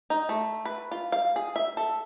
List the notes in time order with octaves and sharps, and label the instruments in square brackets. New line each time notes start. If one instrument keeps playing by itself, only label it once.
[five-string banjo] D#4
A3
B4
F4
F5
G#4
E5
A4